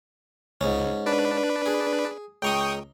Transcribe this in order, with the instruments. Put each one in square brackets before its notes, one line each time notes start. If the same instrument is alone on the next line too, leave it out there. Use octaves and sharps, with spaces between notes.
[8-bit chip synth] C#2 [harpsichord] G#2 C#4
[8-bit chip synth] D4 B4 D5
[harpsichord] G#4
[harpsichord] C#2 A#5 C6 [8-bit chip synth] G5 C#6 D#6